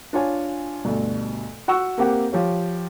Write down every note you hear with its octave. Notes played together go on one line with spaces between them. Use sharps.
D4 F4 C#5 G#5
D2 G2 B2
F#4 F#5 C#6 E6
A#3 C4 G4 A#4 F#5
F3 G4 C#5